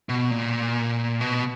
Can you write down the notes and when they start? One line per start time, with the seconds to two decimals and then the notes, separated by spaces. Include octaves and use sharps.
0.09 B2
0.31 A#2
1.21 B2